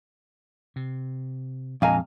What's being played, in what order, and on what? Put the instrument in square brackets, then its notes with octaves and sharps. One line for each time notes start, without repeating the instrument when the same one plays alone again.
[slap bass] C3
[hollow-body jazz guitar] F2 F5 [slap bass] A#2 G#3 D4 [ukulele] D#5 G#5 A#5